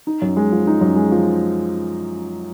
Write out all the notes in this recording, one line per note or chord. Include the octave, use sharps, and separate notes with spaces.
D#4
F#2
G#3
F3
D#4
F#2
G#3
F3